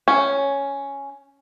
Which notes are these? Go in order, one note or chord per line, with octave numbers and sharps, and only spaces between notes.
C#4